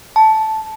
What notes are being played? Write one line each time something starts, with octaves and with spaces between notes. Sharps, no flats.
A5